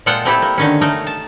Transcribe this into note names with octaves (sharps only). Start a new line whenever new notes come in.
A#2 G#3 F4 A4 F#5 G5
A3 C4 E4 G4 A4
A#3
D3 D#3 C#4
A3 D#4 A#4
A5